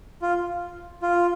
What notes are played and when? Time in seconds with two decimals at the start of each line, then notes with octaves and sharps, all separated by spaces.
0.22 F4
1.02 F4